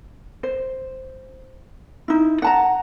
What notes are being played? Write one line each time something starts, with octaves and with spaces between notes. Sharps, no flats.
C5
D#4 E4
F#5 A5 A#5